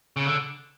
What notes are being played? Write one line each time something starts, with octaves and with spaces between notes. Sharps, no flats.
C#3
D3